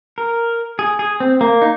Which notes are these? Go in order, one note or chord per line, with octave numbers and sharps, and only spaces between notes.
A#4
G#4
G#4
C4
A#3
D#4